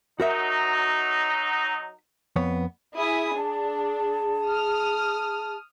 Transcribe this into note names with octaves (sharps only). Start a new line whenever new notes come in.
F#3 D#4 F#4 A#4 E5
F2 B3 C#5
E4 G#4 E5 G#5 D#6
D4 A5
D#6 F6